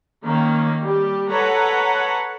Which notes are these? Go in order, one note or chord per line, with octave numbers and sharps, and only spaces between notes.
D#3 A#3 C#4
G3 G4
A4 B4 C#5 F#5 A#5